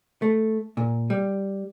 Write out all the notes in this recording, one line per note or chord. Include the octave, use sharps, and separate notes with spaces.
A3
A#2
G3